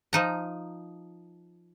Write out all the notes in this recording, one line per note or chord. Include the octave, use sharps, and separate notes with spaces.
F3 D#4 A#5